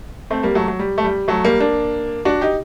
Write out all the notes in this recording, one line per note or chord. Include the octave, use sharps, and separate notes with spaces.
A3 C4
G3 A#3
F#3 A3
F#3
G3
A3
G3
F#3 A3
G3 A#3
A#3 D4
D4 F#4
D#4 G4